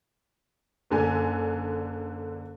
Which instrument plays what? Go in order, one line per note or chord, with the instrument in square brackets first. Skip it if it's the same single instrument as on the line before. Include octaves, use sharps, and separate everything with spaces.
[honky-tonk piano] F#1 D3 G#5